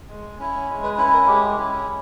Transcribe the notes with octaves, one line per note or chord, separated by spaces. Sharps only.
G#3
C#4 E4
G#3
B4
C#4 E4 B4
A#4
G#3 G4
C#4 E4